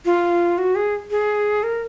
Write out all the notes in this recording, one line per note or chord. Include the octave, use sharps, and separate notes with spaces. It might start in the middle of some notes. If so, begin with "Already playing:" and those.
F4
F#4
G#4
G#4
A#4